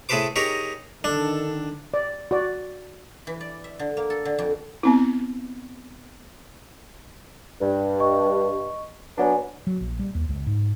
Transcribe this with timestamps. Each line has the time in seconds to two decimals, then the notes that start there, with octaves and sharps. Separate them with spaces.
0.09 A2 G#4 A4 B4 C5 D6
0.36 D#4 G4 G#4 A#4 C#5
1.04 D3 D#3 D4 A4
1.94 D5
2.31 F#4 D5
3.27 E3
3.41 D5
3.64 E5
3.79 D3
3.97 A#3
4.10 A4
4.25 D3
4.38 F2
4.83 B3 C4 E4
7.61 G2
8.00 D#5 C#6
9.17 F#3 B3 D4 B4 D5 G#5
9.67 F#3
9.81 A#1
9.99 G3
10.15 D#2
10.29 C#2
10.47 G#2